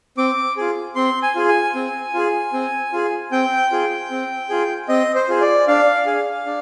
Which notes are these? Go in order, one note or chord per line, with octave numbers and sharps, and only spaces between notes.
C4 D6
F4 G#4
C4 C6
G#5
F4 G#4
G#5
C4
F4 G#4
C4
F4 G#4
C4 G5
F4 G#4
C4
F4 G#4
C4 D#5
C5
F4 G#4
D5
D4 F5
G#4
D4